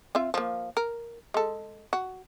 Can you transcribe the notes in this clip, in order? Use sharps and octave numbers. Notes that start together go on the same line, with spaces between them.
C4 F4 E5
F3 A#3
A#4
G#3 A4
F#4